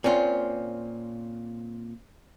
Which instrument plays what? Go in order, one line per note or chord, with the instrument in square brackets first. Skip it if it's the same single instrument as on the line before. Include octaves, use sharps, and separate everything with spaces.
[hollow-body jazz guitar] A#2 C4 C#4 F4